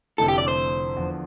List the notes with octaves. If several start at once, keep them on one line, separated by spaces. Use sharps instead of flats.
F1 F2 D3 A3 E4 A4
G4
D5
C5
E2 D3 F3